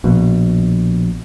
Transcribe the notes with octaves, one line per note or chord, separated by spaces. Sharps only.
A#1 B2